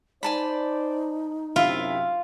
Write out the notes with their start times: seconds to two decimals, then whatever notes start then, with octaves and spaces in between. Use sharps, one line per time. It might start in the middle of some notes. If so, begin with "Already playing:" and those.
0.23 D#4 C5 D5 G#5 A5 B5
1.56 F#2 C3 E4 F4 E5